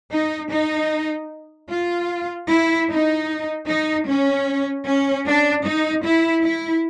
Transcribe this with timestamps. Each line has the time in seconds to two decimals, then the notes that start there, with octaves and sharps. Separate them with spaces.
0.12 D#4
0.51 D#4
1.70 F4
2.49 E4
2.89 D#4
3.68 D#4
4.07 C#4
4.86 C#4
5.26 D4
5.64 D#4
6.04 E4
6.43 E4